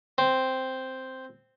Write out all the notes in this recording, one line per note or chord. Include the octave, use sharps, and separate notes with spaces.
C4